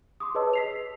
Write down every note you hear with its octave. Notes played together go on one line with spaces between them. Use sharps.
C6 D6 D#6
G#4 B4 C#5 D#5 A5 E6
B6 C7 F7